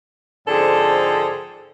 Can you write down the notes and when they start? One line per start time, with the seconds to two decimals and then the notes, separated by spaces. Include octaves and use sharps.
0.47 G#2 D3 F3 C4 G#4 A4